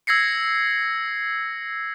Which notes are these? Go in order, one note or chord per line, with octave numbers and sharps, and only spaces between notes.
E6 G#6 A#6 C7 C#7